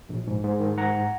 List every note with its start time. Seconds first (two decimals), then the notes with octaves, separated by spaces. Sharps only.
0.09 A#1
0.27 G#2
0.44 G#2
0.60 D#3
0.77 G#2 F#5 A#5